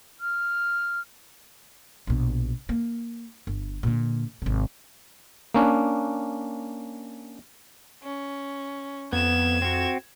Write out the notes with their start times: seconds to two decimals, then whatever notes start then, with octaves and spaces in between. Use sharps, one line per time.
0.20 F6
2.07 A#1 B2
2.69 A#3
3.47 G1
3.83 A#2 D3
4.42 G#1 C3
5.54 A#3 C#4 D4
8.03 C#4
9.13 F2 B3 G#6 E7
9.62 C4 F#4